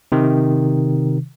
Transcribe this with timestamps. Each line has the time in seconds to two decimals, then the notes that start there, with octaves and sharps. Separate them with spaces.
0.12 C3 D#3